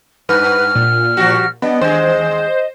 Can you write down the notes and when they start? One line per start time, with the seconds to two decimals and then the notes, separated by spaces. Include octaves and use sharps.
0.29 G2 B4 F6
0.75 A#2
1.17 F3 G3 F#4
1.62 G3 B3 D4 D#5
1.81 D#2 G#3 C5